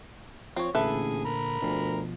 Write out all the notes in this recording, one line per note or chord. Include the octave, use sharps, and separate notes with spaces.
F3 C4 C#5
A1 A#2 D3 G#4 A4 B4 E5
A#4 B5
D2 B2 F3